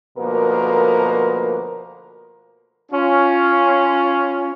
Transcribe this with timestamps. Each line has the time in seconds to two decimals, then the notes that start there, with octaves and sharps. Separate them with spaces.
0.16 D2 B2 F3 A#3 A#4 B4
2.91 C#4 F4